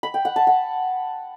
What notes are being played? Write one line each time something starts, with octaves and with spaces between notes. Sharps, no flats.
B5
G5
F#5
A5
F#5